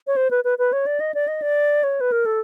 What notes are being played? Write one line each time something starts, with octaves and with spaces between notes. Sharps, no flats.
C#5
C5
B4
B4
B4
C#5
D5
D#5
D5
D#5
D5
C#5
B4
A#4
A4